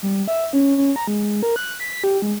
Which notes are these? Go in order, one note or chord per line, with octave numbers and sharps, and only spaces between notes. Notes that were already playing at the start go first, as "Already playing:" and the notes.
G3
E5
C#4
C#4
A#5
G#3
A#4
F#6
B6
G4
G#3